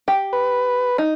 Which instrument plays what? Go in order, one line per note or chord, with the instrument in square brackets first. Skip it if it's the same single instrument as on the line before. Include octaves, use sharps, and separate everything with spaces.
[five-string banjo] G4
[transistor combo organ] B4
[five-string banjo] D#4